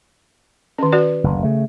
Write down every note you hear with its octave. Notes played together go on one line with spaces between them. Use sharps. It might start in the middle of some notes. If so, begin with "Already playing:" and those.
D#3 C#4
F#4 B4 D5
F#1 D2
C#3 A3